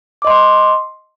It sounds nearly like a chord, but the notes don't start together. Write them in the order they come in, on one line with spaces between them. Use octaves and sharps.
D6 D#5 C6